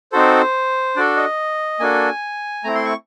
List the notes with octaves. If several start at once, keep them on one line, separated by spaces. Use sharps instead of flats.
C4 D#4 F#4 A4 C5
D4 F#4 A4 D5
D#5
A#3 D4 F#4 A4 G#5
A3 C4 E4 A#5
C6
C#6